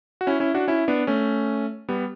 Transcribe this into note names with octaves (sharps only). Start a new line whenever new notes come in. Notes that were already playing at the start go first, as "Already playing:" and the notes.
F#4
C#4 E4
C#4 E4
D4 F#4
C#4 E4
B3 D4
A3 C#4
G3 B3